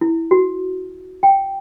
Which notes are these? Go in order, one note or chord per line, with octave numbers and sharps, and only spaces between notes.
E4
F#4
G5